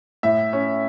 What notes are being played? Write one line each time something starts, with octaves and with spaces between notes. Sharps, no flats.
A2 E5
C#4